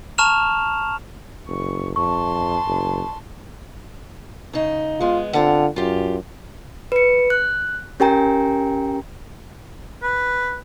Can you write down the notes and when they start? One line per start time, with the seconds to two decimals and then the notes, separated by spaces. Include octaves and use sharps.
0.18 A5 A#5 C#6 F6 E7 F7
1.47 F#1 C#6
1.96 F2 A5 C6 C#6
2.66 F#1
4.53 C#3 D#4
5.01 G#3 B3 F4
5.34 D3 C4 F4 F#5
5.76 F#2 F4 G4
6.92 B4 C#7
7.30 F#6
8.00 C#4 G4 A#4 G5 G#5 A#5
10.03 B4